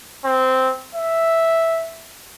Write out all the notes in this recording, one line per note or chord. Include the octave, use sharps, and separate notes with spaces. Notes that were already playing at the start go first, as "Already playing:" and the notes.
C4
E5